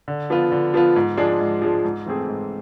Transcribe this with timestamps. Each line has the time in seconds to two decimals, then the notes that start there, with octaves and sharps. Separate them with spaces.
0.08 D3
0.30 F3 B3 F4
0.52 D3
0.74 F3 B3 F4
0.96 G#2
1.17 F3 G#3 D4 G#4
1.40 G#2
1.62 F3 G#3 D4 G#4
1.84 G#2
2.06 E3 A3 C4 G#4
2.28 G#2